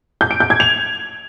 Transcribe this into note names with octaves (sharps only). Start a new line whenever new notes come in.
G6
D7
G6
G#6
F7